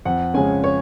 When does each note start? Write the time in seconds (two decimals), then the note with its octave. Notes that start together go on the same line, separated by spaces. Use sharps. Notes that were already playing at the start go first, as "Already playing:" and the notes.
0.05 F2 F#5
0.34 C#3 G#3 C#4 G#5
0.64 C#5